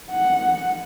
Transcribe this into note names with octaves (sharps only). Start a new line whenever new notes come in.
F#5